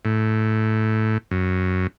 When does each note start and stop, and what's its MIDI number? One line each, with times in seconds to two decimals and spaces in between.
0.05 1.18 45
1.31 1.87 42